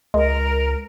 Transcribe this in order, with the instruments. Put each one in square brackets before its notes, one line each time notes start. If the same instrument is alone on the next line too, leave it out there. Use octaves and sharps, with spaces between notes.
[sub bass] C#2 [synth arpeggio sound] G#3 [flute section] A#4